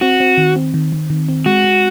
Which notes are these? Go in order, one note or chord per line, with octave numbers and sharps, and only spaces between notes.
C4 F#4
C4
D#3
C4
D#3
D#3
D#3
C4
G#3 F#4
G#3